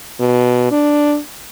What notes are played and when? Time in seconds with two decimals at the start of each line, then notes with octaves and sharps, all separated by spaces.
0.20 B2
0.72 D4